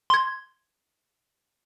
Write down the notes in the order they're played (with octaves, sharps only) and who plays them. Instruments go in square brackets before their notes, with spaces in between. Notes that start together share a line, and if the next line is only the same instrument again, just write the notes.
[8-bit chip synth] C6 G#6